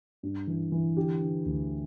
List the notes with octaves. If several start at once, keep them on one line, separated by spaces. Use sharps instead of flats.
G2
E3
E3
D3 G4
D3
D2